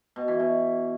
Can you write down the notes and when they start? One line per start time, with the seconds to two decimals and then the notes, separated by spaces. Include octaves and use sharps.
0.16 B2
0.28 E3
0.40 B2